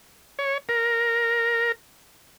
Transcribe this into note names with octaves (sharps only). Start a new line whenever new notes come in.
C#5
A#4